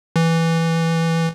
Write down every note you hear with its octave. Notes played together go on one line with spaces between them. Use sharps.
E3